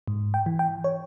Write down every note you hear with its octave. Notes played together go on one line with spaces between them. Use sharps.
G#2
G5
E3
G5
C#5